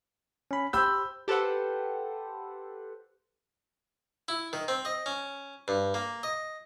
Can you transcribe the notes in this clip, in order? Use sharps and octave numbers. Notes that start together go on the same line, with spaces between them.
C#4 B5
G4 C5 B5 E6 G6
G4 A4 B4 C5 F#5
E4
D#3
C4
D#5
C#4
G2
A#3
D#5